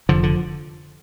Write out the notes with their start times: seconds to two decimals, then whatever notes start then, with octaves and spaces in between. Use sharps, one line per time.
0.09 F1 D3 F3
0.23 D3